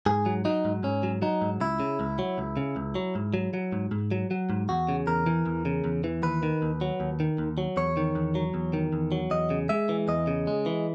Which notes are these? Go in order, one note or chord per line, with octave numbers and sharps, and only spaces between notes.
G#2 G#4
F#3
F#3 D#4
G#2
G#2 C#4
F#3
F#3 D#4
G#2
C#2 E4
C#3
C#2
F#3
C#2
C#3
C#2
F#3
G#2
F#3
F#3
G#2
G#2
F#3
F#3
G#2
E2 F#4
C#3
E2 A#4
E3
E2
C#3
E2
E3
D#2 B4
D#3
D#2
F#3
D#2
D#3
D#2
F#3
E2 C#5
D#3
E2
F#3
E2
D#3
E2
F#3
E2 D#5
C#3
G#3 E5
E3
E2 D#5
C#3
G#3
E3